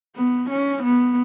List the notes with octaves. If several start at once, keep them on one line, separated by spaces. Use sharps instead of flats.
B3
C#4
B3